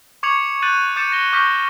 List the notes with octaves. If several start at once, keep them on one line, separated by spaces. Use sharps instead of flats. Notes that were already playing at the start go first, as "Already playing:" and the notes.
C#6 D6 G#6 C#7 F7 F#7
F#6 G6 A6 D#7 F#7
D6 G6 A6 C#7 E7
A#6 G7
C#6 D6 F6 G6 A#6 B6